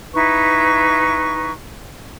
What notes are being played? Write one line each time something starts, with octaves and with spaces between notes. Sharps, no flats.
D#4 E4 B4 C#6